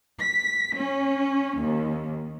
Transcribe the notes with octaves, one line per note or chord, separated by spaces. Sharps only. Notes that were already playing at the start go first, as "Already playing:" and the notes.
B6
C#4
D#2